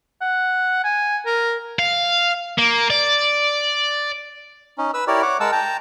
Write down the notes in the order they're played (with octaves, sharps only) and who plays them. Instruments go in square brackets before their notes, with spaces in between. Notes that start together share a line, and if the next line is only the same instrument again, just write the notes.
[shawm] F#5
G#5
A#4
[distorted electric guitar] F5
A#3
D5
[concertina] C#4 D#4
B4 E6
E4 G4 A#4 C#5 D5
C#5 F#5 D6
G#3 A#4 F#5 A5 E6
G5 A5 A#5